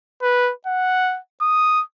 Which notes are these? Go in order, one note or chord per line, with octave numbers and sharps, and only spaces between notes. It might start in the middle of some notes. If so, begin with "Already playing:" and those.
B4
F#5
D#6